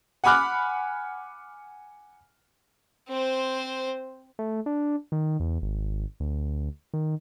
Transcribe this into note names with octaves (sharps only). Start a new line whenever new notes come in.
F#5 G#5 B5 D6 F6 F#6
C4 C5
A3
D4
D#3
E2
G#1
D2
D#3